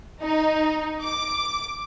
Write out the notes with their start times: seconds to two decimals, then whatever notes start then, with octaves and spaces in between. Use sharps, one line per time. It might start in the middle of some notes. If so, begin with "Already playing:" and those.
0.21 D#4
1.02 D6